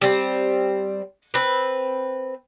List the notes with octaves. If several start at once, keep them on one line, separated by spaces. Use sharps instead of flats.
G3 C4
C4 B4